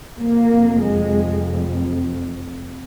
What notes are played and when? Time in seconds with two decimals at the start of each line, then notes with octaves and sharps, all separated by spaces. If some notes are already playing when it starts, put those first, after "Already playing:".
0.21 F1 F2 A#3
0.82 G#3